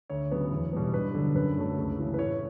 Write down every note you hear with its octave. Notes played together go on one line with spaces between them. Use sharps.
D2 C#5
C#3 F#3 B3
E2
B2 G3 B3
G2 B4
D3 F#3
F#2 B4
D3 F#3 A3
C#2
C#3 E3
B4
A2 C#5